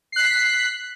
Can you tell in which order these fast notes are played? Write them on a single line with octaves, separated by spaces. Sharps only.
C7 F#6 B6